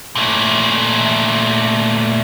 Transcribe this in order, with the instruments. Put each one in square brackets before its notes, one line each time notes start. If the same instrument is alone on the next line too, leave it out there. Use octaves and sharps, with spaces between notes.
[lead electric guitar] A#2 A3